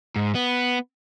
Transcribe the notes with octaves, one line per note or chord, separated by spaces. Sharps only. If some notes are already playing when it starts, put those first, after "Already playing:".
G#2
B3